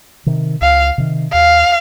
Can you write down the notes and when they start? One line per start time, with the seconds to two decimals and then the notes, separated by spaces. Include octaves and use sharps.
0.26 C3 D#3
0.61 C#2 F5
0.98 C3 D#3
1.33 D#2 F5